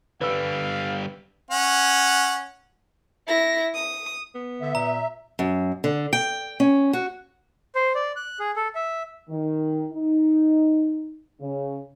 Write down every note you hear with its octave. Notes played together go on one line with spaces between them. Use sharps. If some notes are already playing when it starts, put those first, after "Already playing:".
D3 G3 B4 F5 E6
C#4 F#5
E4 A#6
D#6
B3
D3 E5
A#2 A#5
F#2
D3
G5
C#4
F#4
C5
D5
F#6
G#4
A4
E5
D#3
D#4
C#3